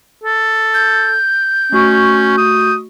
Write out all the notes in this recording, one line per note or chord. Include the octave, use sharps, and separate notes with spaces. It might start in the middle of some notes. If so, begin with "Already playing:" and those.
A4
G6
A3 C#4 F#4 C#6
D#6